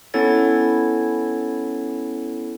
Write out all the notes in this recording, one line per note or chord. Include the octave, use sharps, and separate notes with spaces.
B3 C#4 E4 A4 C#5 A6